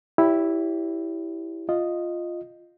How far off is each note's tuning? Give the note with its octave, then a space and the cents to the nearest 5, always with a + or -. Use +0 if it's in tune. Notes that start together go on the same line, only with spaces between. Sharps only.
E4 +0 G4 +0 C#5 +45
F4 +0 D#5 -5